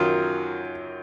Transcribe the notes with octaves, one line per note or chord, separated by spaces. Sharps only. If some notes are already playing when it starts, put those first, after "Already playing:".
Already playing: F#2 D#3 F#3 F4